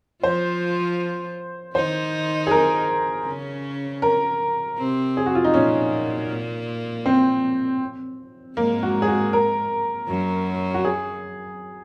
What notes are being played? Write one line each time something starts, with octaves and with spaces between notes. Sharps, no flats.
F3 F4 C5
D#3 D#4 C5
G#4
A#4
C#3 C#4
A#4
C3 C4
G#4
F#4
F4
D#4
A#2 A#3 C#4
C4
G#2 G#3 A#3
F#4
G#4
F#4
A#4
F#2 F#3
F#4
G#4